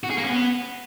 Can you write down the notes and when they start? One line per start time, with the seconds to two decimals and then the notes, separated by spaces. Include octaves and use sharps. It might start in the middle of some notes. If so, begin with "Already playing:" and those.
0.03 F#4
0.10 G#4
0.17 A#3
0.24 C#4
0.31 B3